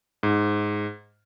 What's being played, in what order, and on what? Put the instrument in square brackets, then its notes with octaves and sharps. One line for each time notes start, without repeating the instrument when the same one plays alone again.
[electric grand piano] G#2